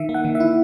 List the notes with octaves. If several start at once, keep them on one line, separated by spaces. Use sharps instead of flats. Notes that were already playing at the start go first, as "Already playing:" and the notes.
Already playing: D#3 E5
A#3
F#5
D#3
E5
E4